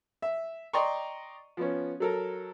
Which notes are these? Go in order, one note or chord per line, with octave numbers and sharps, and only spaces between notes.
E5
D5 D#5 G5 A#5 C6 C#6
F3 B3 C#4
F#3 A4 A#4